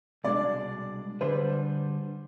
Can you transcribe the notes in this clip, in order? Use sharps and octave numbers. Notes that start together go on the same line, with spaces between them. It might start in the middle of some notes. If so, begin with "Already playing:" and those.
C2 B2 G#3 D4 D5
D3 G3 D4 G#4 B4 C5